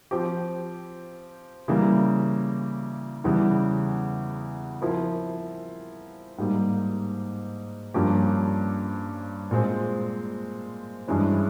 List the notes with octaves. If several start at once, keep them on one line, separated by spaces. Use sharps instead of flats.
F3 C4 G4
C#3 E3 G3 A#3
E2 C#3 E3 G3
F3 C4 E4 A#4
G#2 G3 A#3
G2 F3 A#3 C#4 G4
A#2 G#3 C4
G2 E3 G#3 C#4